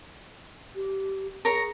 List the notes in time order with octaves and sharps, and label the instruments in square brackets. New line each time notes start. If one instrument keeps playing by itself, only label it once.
[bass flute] G4
[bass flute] G#4 [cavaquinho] A#4 C#5 A#5